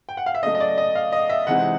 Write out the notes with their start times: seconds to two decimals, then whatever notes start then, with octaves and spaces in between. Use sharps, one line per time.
0.09 G5
0.17 F#5
0.26 F5
0.34 E5
0.42 C#3 F#3 A3 D#5
0.55 D#5
0.60 D5
0.78 D#5
0.95 F5
1.13 D#5
1.30 E5
1.47 C3 E3 G#3 C4 D#4 F#5